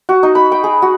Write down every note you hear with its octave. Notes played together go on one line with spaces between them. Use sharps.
F#4
D#4
B5
G5
G#4
F#4